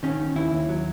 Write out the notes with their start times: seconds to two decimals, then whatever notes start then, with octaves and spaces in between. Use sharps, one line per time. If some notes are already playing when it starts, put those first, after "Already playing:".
0.03 D#3 C#4
0.20 D#3
0.36 D#2 E4
0.52 D#2
0.69 F#3